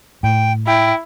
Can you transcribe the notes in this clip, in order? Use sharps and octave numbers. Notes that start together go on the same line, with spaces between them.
A2 G5
E4 G5